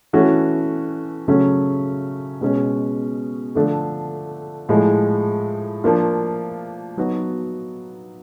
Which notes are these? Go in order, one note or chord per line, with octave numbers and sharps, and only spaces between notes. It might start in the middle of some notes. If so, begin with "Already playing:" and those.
E3 A3 C#4 F#4
C#3 F#3 A3 C#4
B2 G#3 C#4
D3 F3 A3 D4
A2 F3 G#3
F3 A#3 D4 F4
F#3 B3 D#4 F#4